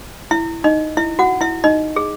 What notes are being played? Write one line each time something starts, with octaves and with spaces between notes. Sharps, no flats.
E4 E5
D#4 D#5
E4 E5
F#4 F#5
E4 E5
D#4 D#5
G#4